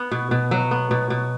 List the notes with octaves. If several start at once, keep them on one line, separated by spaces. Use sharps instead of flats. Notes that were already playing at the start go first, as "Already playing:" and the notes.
Already playing: B3
B2
B2
F#3
B3
B2
B2